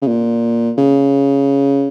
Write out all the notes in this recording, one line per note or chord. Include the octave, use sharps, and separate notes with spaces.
C#3
A#2
C#3